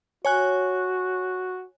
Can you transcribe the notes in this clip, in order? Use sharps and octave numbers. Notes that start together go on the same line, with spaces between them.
F#4 C#5 G#5 F#6